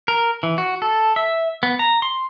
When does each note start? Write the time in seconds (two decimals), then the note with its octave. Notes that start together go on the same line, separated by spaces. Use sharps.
0.08 A#4
0.43 E3
0.58 F#4
0.82 A4
1.16 E5
1.63 B3
1.79 A#5
2.02 C6